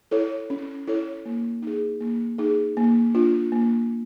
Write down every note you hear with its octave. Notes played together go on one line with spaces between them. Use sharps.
E4 A4 C#5
C#4
E4 A4 C#5
A#3
D#4 G#4
A#3
D#4 G#4
A#3
D4 F4
A#3